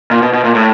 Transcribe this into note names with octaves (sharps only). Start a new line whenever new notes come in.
A#2
B2
B2
A#2
A2